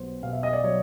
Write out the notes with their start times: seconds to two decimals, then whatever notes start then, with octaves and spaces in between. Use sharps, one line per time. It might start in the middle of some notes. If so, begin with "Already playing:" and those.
Already playing: B1 F#3 B3 C5
0.23 B2 F5
0.33 E5
0.43 D#5
0.53 D5
0.64 F#3 C#5